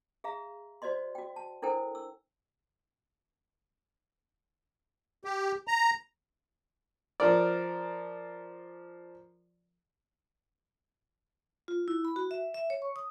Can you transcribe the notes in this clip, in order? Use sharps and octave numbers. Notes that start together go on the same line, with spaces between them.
G#4 E5 F5 A#5
F#4 C5 D5 D#5 C6
F#4 G5
A5
D4 E4 A4 A#4 C5 G5
E6
G4
A#5
F3 A#4 D5
F4
E4
B5
F#4
E5
E5
C#5
C#6
D#6